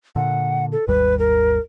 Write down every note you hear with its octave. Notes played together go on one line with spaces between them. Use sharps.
A#2 D3 F#5
A4
G#1 D#2 G3 B4
A#4